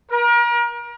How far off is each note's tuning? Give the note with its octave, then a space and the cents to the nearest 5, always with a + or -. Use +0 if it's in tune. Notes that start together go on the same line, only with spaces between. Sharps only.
A#4 +35